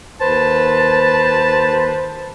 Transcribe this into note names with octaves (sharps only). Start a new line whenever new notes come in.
D#2 B4 C5 A5